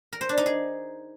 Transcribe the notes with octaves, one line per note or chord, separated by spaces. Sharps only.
A#4
C5
D4
D#4
G#4